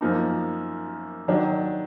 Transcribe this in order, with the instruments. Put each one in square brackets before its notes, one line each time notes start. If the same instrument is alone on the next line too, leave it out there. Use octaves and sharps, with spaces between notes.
[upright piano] F#2 F3 A#3 D#4
D#3 F#3 D4